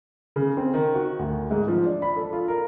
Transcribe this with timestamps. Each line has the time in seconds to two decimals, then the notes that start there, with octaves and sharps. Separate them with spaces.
0.36 C#3
0.57 C4
0.74 D#3
0.95 F#4
1.19 D2
1.51 G#2
1.68 F3
1.86 D4
2.02 B5
2.16 A4
2.33 F4
2.48 A#4